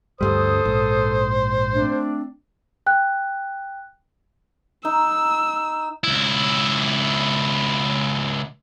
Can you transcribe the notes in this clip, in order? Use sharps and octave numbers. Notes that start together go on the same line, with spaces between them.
D2 G2 G3 A4 C5 D#6
A#1 G#2
A3 C4 D4
G5 F#6
D#4 E6
C#2 E4